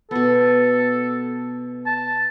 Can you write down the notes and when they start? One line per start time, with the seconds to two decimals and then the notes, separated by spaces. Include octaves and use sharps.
0.11 B2 B3 A4
1.86 A5